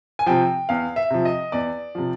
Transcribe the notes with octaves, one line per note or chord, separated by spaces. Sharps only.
G#5
C3 F3 G5
E2 F5
E5
C3 F3
D#5
E2 D5
C3 F3